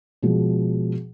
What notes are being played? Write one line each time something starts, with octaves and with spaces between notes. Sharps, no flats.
B2 F3 G#3